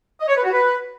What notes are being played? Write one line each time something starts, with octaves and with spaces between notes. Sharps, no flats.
D#5
C#5
B4
F#4
B4